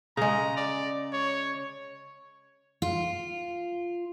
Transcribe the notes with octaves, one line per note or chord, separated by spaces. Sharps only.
C#3 G#3 A#5
D5
C#5
F4